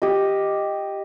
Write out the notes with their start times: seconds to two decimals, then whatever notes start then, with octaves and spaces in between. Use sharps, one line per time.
0.02 G4 D#5